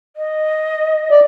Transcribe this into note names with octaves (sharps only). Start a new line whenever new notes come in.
D#5
D5